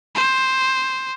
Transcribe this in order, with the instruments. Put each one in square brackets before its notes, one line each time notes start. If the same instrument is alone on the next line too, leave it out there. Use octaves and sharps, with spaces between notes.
[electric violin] C5